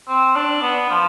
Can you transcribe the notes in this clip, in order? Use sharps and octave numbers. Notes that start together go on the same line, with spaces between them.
C4
D4
B3
F3